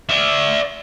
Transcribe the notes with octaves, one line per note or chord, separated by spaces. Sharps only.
D5 E5